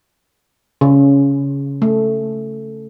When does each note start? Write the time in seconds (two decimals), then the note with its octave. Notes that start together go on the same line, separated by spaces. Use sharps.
0.81 C#3
1.82 A3